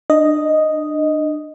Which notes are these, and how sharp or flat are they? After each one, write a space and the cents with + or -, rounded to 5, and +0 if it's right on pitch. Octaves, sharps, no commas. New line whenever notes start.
D4 +30 D#5 +0